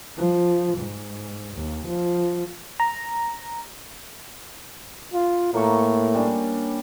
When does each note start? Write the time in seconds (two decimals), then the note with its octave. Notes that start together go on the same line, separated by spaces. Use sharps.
0.17 F3
0.79 G#2
1.55 D#2
1.88 F3
2.80 A#5
5.13 F4
5.54 A2 A#3 C#6
6.14 G3 C#4 D4